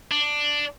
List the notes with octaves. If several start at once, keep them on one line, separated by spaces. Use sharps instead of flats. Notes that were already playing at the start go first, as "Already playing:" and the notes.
D4